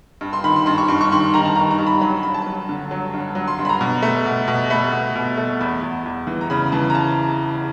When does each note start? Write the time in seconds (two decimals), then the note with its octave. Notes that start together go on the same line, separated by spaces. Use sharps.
0.21 G2
0.33 C6
0.44 D#3 B5
0.56 C6
0.66 G2 C6
0.78 C#6
0.88 G2 C6
1.01 C#6
1.11 D#3 C6
1.34 D#3 A#5
1.45 A5
1.56 D#3 A#5
1.71 A#5
1.79 G2
1.87 B5
2.01 F#3 B5
2.23 G2 B5
2.34 A5
2.47 F#3
2.69 D3
2.91 F#3
3.14 G2
3.35 F#3
3.48 C6
3.59 G2
3.65 B5
3.69 A#5
3.81 B2
4.02 A3
4.26 B2
4.48 B2
4.70 A3 B5
4.92 B2
5.16 B2
5.37 A3
5.61 E2 B5
5.82 E2
6.06 E2
6.27 E3
6.41 A#5
6.50 C#3 B5
6.72 E3 A5
6.90 A#5
6.95 A5